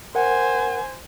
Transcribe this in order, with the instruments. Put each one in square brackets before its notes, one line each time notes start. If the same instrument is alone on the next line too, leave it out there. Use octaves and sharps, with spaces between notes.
[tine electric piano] A#4 F#5 [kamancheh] C5 G#5